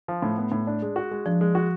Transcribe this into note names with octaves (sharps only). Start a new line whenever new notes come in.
F3
A2
B3
A2
D4
G#3
F#4
G#3
F3 D4
G#3
F#4